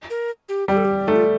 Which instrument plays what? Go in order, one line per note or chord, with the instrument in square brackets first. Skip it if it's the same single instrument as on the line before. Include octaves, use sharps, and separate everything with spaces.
[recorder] A#4
G4
[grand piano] G3 [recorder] G4
[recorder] A4
G4
[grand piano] A3 [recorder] D#4
[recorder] F4